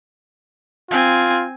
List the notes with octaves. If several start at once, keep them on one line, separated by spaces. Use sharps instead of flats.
C4 F4 G#5